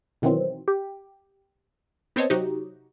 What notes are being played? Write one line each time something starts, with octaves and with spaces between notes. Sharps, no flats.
B2 D#3 E3 F#3 C4
G4
B3 C4 C5 C#5 D#5 A5
C3 F#3 D#4 F#4 G4